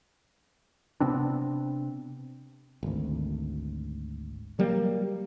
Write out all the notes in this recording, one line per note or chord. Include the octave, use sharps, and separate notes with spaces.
C3 B3 C4 D4
G#1 D2
F#3 G3 A#3